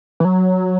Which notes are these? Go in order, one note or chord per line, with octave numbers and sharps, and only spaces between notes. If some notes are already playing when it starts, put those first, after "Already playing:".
E3
F#3